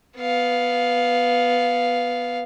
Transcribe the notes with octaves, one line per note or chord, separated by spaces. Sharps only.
B3 F5